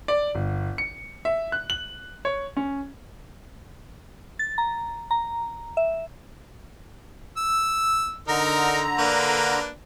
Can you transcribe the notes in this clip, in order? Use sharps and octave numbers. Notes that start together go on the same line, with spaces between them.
D5
G1
C#7
E5
F#6
F#7
C#5
C#4
A6
A#5
A#5
E5
E6
D3 D#4 A#4 A#5
A#3 D4 B4